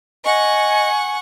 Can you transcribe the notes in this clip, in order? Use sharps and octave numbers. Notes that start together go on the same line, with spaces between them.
D#5 F#5 G#5 C#6